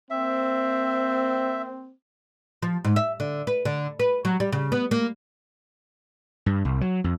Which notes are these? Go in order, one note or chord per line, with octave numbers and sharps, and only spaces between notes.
A#3 C4 E5
F3
G#2
E5
D3
B4
D3
B4
F#3
G3
C#3
B3
A#3
G2
C2
F#3
F2